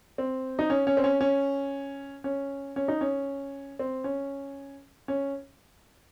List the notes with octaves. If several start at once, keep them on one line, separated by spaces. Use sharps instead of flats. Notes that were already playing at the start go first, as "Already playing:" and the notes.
C4
D#4
C#4
C#4
C4
C#4
C#4
C#4
C#4
D#4
C#4
C4
C#4
C#4